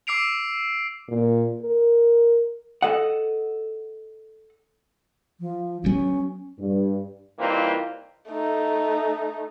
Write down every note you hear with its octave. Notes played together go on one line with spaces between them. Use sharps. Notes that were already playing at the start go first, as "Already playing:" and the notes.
D6 E6 C7 D7 F7
A#2
A#4
A4 D#5 F#5
F3
D2 F#3 B3 C#4
G2
E3 G3 A#3 C4 D#4 F4
A3 D#4